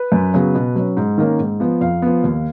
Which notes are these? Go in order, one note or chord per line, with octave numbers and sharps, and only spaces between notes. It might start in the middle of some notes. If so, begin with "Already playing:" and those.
Already playing: B4
F#2
C#3 F#3 B3
B2
F#3 C#4
G#2
D#3 A#3 C#4
G#2
F3 B3
F2 F5
F3 B3
D#2